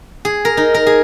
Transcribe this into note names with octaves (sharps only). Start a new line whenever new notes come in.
G#4
A#4
D#4
A#4
G#4